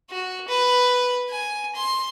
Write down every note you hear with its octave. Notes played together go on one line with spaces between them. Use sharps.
F#4
B4
G#5
C6